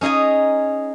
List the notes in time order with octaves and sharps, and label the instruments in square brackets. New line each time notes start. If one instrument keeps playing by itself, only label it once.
[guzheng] C#4 D#4 G#4 D#5 G#5